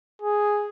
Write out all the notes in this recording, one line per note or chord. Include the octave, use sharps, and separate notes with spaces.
G#4